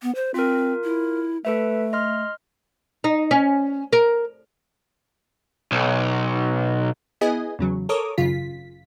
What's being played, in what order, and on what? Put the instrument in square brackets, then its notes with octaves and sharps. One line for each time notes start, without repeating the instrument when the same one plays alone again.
[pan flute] B3
C5
[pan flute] C4 [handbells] F4 A#4
[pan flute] E4
[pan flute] A3 [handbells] A4 B4 E5
[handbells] D#5 C6 F6
[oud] D#4
C#4
A#4
[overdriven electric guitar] B1
[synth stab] B3 E4 G#4 D#5 G#5
E2 C#3 F#3
A4 A#4 C#5 D6 D#6
G#1 F#2 C#3 F4 B6